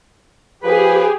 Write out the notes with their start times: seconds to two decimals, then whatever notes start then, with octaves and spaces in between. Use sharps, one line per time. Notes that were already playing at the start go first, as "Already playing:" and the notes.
0.63 F3 G4 G#4 B4